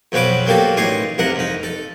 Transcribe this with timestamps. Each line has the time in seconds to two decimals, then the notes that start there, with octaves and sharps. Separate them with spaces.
0.12 F2 B2 F3 F#3 B4 D6
0.46 F#3 A#3 G4 A4
0.77 A1 D4 D#4 C#5 C6
1.18 C2 F2 A#4 F#5
1.35 F2 D#4
1.63 A4